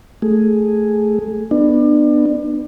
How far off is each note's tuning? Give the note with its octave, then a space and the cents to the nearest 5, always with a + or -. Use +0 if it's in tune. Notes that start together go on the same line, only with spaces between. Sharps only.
A3 +0 G#4 +0
B3 +0 D4 +30